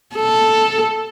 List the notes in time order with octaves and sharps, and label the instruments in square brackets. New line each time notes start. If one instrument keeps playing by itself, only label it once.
[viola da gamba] A4